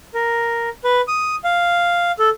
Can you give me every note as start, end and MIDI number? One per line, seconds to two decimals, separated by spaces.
0.14 0.69 70
0.84 1.01 71
1.08 1.36 87
1.44 2.12 77
2.19 2.29 69